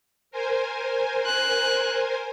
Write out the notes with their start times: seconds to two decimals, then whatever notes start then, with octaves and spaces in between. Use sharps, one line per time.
0.31 A#4 C5 G#5
1.26 F#6